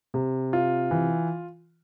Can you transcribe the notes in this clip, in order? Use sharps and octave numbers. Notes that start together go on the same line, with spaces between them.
C3
F4
E3